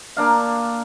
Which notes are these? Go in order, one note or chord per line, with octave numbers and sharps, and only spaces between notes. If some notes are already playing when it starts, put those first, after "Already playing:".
A#3 D4 F5